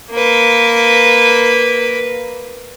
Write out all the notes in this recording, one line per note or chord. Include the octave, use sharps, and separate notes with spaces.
A#3 B4